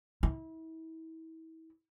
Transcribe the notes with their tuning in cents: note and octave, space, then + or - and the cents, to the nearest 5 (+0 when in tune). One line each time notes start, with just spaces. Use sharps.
E4 -35